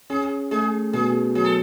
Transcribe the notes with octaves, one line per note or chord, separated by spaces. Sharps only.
C#4 G#4
A3 G#4
B2 G#4
F#3 G#4
A4